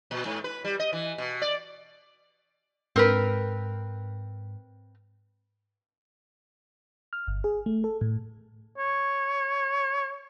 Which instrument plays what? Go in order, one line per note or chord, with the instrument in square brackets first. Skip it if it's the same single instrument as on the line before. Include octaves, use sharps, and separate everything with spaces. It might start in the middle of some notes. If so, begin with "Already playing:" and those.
[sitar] A#2
G#2
B4
G3
D#5
E3
B2
D5
[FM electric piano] G#2 [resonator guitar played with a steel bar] C4 A#4 B4
[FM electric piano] F6
G1
G#4
A3
A4
A2
[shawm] C#5